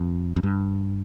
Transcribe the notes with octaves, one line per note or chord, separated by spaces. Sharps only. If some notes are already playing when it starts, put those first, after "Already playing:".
Already playing: F2
F2
G2